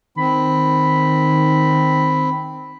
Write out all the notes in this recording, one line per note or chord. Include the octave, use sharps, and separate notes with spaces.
D#3 C4 B5